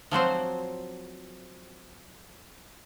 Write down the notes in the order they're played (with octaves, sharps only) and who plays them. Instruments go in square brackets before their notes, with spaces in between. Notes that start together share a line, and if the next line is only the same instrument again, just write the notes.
[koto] F3 F#3 C4 C5